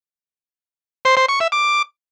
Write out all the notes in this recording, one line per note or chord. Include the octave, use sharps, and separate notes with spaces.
C5
C5
C#6
E5
D6